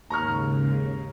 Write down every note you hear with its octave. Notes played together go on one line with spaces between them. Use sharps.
D#2 G#2 C#3 A#5 C#6 F6